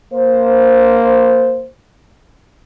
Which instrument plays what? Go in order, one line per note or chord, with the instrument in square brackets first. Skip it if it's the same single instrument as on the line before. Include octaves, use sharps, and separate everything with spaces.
[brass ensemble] A#3 C5